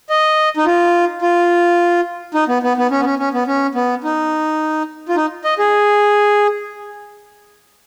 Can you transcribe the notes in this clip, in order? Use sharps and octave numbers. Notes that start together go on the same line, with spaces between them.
D#5
D#4
F4
F4
D#4
B3
B3
B3
C#4
B3
C#4
C#4
B3
C#4
B3
D#4
F4
D#4
D#5
G#4